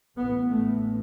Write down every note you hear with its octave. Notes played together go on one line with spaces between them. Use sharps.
A1 A2 B3
A3